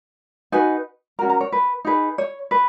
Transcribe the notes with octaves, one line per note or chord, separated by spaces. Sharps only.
D#4 F#4 B4 G#5
C#4 F#4 A#4 A#5
A#5
C#5
B4
D#4 G#4 B4
C#5
B4